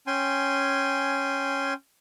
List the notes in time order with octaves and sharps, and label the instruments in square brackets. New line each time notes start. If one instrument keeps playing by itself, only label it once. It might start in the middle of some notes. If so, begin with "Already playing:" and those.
[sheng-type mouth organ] C#4 G5 G#5 C6